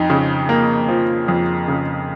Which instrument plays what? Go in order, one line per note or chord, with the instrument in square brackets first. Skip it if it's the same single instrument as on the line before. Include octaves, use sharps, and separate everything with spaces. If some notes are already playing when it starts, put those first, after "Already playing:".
Already playing: [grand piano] F2 D#4
C#3
A#3
F3
F2
C#3